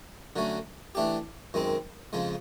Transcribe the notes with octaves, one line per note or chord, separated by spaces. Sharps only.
D3 F#3 A3 C#4
E3 A3 D4 G4
F#2 D#3 G#3 C4
F2 C#3 F3 G#3